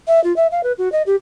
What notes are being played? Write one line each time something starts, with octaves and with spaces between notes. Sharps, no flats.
E5
F4
E5
F5
B4
F#4
D#5
G4